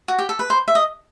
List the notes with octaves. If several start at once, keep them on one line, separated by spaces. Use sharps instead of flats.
F#4
G4
A4
B4
C5
E5
D#5